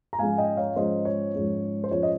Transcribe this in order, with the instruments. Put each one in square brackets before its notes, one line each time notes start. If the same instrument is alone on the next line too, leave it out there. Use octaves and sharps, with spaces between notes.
[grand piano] A#5
G#2 F3 G#3 C#4 F5 G#5
D#5 G5
C#5 F5
G#2 F3 G#3 C#4 C5 D#5
C#5
G#2 F3 G#3 C#4
C5
G#2 F3 G#3 C#4 C#5
D#5